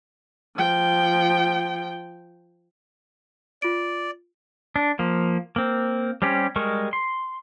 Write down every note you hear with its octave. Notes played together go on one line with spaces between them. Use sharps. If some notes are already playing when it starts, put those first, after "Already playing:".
F3 G5
F4 D5 D7
D4
F3 A#3
A#3 C4
G3 C4 C#4 G4
G3 G#3 A#4 C#6
C6